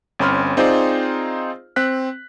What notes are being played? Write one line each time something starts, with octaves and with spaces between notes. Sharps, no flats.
G1 C4 C#4 B5 C6 F6
C4 D#4 F4 G#4 C5 D5
C4 F#6 B6